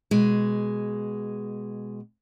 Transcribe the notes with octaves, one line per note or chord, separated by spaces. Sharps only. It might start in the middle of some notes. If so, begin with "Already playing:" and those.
B2 G#3